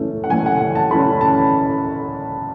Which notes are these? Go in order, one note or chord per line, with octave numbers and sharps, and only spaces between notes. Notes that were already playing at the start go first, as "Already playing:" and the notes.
Already playing: F#2 E3 A3 C#4
F#5
F#2 E3 A3 C#4 G#5
F#5
F#5
A5
F#2 E3 A3 C#4 B5
A5